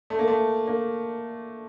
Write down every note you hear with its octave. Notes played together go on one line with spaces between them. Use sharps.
A3
A#3
A3
A#3